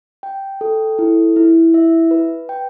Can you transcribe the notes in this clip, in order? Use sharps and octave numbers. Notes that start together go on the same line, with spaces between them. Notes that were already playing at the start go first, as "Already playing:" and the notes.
G5
A4
E4
E4
E5
B4
G5